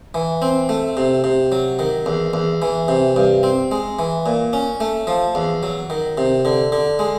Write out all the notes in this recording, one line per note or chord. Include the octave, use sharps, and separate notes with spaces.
E3
C4
A3
C3
C3
F#3
D#3
E2
E2
E3
C3
G2
C4
G#3
E3
A#2
C#4
A3
F3
E2
F#3
D#3
C3
D3
D3
G#3